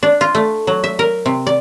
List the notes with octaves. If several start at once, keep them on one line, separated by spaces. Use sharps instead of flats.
D4
F4
A3
F#3
E5
A#4
C3
D5